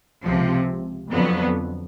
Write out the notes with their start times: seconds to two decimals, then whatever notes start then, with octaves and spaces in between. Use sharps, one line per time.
0.20 C#2 C3 F3
1.11 F2 D3 F#3 B3